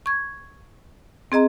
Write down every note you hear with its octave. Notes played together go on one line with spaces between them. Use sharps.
C#6 G#6
C4 G#4 D#5 A#5